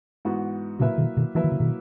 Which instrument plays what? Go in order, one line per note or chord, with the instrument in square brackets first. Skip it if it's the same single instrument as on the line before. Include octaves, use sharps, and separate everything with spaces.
[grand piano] G#2 E3 B3 F#4
[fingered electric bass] A#2 C#3 [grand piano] F#3 A#3 E4 B4 E5
[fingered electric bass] B2 D#3
B2 D#3
[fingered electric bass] E3 [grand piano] F#3 A#3 E4 B4 E5
[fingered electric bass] D#3
C#3
B2 D#3